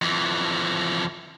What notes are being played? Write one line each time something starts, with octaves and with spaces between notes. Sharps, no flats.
F2 E3